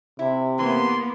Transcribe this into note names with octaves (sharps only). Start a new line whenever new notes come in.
C3 E4
E3 A#3 B3 C6